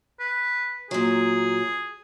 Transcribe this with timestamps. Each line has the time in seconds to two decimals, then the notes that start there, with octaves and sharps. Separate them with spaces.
0.20 B4
0.91 A#2 F#3 G#4